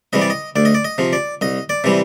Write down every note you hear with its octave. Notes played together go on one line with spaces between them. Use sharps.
C3 E3 G3 D#5
D5
D#5
D2 D5
D#5
D5
D#5
C3 F3
D5
C2 D#5
D5
C3 E3 G3